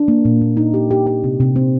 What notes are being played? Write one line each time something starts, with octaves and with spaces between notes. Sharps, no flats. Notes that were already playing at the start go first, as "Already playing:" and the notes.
Already playing: D4
A#3
A#2
A#2
D#4
G4
G4
G4
C3
C3
C4